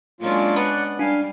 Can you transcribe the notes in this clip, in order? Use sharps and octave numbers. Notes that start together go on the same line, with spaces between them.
F#3 G#3 A#3 C#4 D4 F4
B3 D5 F#5
G3 D4 F5 G#5